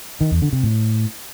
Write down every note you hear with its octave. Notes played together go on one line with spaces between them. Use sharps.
D#3
E2
D3
C3
A2